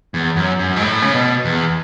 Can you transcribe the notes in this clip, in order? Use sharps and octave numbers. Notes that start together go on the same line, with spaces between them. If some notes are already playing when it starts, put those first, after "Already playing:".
E2
F#2
F#2
G#2
A2
C#3
B2
E2